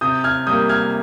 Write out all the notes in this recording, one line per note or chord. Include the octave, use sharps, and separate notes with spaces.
C3 D#6 G6
F6 G#6
G3 A#3 D#6 G6
F6 G#6